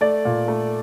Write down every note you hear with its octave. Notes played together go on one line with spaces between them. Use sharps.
A3 D5
A#2
A3